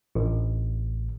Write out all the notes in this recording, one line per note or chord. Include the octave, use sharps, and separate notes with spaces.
A1